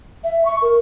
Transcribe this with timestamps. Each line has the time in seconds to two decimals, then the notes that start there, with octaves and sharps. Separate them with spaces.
0.24 E5
0.45 C#6
0.62 A#4